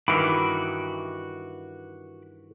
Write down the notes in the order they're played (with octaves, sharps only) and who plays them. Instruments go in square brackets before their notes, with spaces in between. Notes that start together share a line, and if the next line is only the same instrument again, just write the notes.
[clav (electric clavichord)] G2 D#3 E3 [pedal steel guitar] F#4 B5 D6